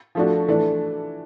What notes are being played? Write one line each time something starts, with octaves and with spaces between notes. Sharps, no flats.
F3 A3 D4 F#4
E3 A3 D4